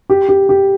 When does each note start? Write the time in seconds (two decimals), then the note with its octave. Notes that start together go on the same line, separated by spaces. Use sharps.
0.10 G4
0.29 G4
0.49 G4